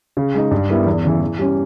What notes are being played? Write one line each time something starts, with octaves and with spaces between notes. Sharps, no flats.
C#3
G#3 D#4
G2
G3 B3 E4 A#4
E2
C#3 E3
E3
G3 C#4